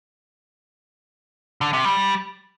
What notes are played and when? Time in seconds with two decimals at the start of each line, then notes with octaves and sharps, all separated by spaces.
1.61 D3
1.73 C3
1.85 G3